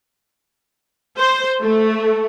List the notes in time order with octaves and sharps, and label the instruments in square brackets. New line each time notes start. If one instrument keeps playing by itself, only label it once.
[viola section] C5
A3